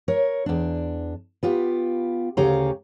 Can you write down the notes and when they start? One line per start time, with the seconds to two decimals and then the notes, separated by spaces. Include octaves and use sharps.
0.08 A#4 C#5
0.46 E2 D4
1.43 B3 F4 G4
2.37 D2 C#3 C#4 G4 F5 A#5